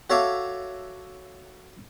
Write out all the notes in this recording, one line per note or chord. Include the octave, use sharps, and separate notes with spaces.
F#4 A4 C#5 E5 F5 D6